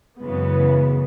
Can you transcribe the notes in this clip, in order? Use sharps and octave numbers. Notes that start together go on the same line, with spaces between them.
F#2 C#3 E3 G#3 B3